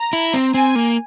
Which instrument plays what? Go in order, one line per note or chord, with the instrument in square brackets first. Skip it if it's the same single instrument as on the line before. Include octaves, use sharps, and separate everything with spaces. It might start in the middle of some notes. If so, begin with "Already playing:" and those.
Already playing: [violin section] A#5
[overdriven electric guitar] E4
C4
[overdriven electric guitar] C4 [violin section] G#5
[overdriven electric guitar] A#3